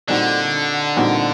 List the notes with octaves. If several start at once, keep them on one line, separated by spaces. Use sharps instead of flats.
A#2 D3 G3 C4 D#4 F#4
A#2 G3 C4 D#4 F#4